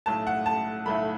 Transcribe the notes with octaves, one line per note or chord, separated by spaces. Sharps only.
B1 A2 A3 A5
F#5
A5
B1 A2 A3 B5